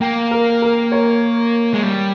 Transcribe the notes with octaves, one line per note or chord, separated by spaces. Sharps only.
A#3 G5
A#4
A#4
C#5
G#3
G3